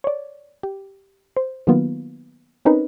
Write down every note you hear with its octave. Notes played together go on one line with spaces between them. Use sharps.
C#5 D5
G4
C5
D#3 F#3 A#3 B3 F4
C4 C#4 D#4 A#4 B4